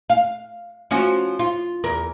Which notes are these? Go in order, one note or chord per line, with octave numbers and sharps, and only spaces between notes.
F5
F3 C#4 F#4
F4
E2 A#4